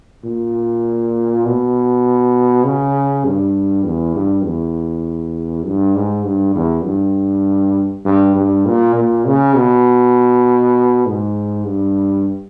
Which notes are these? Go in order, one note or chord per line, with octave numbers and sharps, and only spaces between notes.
A#2
B2
C#3
G2
E2
G2
E2
G2
G#2
G2
E2
G2
G2
G2
A#2
A#2
C#3
B2
G#2
G2